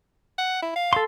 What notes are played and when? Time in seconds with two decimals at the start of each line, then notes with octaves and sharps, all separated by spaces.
0.38 F#5
0.62 E4
0.76 F5
0.93 A4 C6